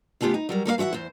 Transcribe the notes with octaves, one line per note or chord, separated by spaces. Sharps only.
C#3 A3 B3 F4 G4
D#4
F#3 G3 A#4
G3 A#3 C5 F5
E3 F#4 A#4 E5 F#5
E2 C5